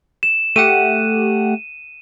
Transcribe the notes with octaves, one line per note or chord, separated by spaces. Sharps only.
E7
A3 G4 F#5 D#7